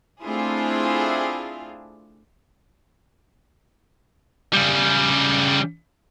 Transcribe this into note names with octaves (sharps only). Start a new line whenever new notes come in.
A3 C4 D4 E4 F4 G#4
C#3 G3